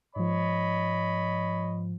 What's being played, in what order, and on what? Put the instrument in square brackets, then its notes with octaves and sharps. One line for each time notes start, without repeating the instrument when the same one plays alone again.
[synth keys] G#2 F3 [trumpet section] C#5 D#5 B5